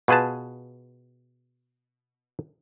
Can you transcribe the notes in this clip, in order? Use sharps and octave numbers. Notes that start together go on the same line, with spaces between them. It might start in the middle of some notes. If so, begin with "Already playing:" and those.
B2 F4 G#4 B4 A5